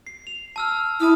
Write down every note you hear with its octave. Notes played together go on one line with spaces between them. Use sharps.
C7
F7
A5 E6 F6
E4 A5 D#6 F6